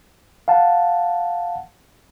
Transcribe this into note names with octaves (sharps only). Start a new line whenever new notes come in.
F5 F#5 A5